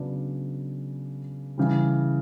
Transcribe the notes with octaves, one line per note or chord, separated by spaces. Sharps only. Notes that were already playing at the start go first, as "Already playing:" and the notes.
Already playing: C#3 F#3 B3 D4
C#3 E3 G3